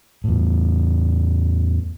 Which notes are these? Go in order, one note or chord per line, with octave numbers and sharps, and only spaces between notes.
E2 A2